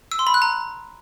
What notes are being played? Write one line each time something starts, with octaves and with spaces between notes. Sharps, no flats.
E6
C6
B5
F#6
A#5